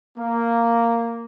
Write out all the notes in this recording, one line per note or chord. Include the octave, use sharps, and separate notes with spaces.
A#3